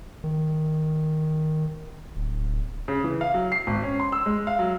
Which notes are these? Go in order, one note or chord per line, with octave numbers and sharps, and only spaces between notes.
D#3
D1
C#3
E3
F5
F#3
C7
G#1
C#4
C6
E6
G#3
F5
F#3